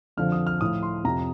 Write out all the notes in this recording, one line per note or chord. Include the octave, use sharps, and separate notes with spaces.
F2 D3 F3 F6
D#6
F6
A2 F3 D#6
C6
F2 C3 F3 A#5